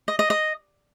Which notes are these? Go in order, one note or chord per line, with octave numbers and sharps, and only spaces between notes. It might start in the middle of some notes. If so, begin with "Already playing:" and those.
D#5
D#5
D#5